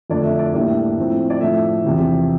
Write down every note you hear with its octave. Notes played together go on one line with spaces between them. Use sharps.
F2 D3 A3 D4 D5
E5
D5
A2 G3 A#3 D4 E5
A2 F3 C4
D5
A2 F3 A3 D4 E5
E2 C3 F3